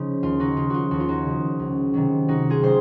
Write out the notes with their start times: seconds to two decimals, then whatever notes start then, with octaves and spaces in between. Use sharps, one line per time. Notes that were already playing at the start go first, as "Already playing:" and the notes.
Already playing: C#3 F3 D#4
0.23 D#2 F4
0.40 D#4 F#4
0.56 C#3 F3 F4
0.70 F4 F#4
0.91 D#2 F#4
1.00 F4
1.08 D#4 F#4
1.25 C#3 F3
1.59 C#2
1.94 C3 D#3 F#3
2.28 C#2 D#4 F#4
2.50 F4 G#4
2.62 C3 D#3 F#3 C5